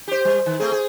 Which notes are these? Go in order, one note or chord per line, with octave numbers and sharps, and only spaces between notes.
G4 C5
G3
D#3
A3 C4 G#4
G#4